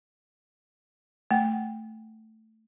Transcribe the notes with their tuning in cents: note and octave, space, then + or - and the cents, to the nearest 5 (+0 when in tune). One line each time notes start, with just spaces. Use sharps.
A3 +5 F#5 +35